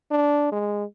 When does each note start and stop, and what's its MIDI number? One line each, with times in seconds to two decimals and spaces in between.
0.11 0.51 62
0.52 0.84 56